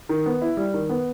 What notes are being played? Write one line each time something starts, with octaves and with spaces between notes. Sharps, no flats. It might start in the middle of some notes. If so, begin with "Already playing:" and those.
D#3
B3
E4
G3
D#3
B3